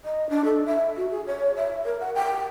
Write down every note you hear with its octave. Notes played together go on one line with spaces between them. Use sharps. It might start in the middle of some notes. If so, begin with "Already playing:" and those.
D#5
D4
A4
E5
F#4
G#4
C#5
E5
A#4
F#5
G5